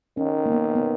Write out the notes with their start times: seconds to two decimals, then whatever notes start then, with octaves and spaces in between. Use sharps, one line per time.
0.17 D#3 C#4
0.46 A#3
0.52 B3
0.75 B3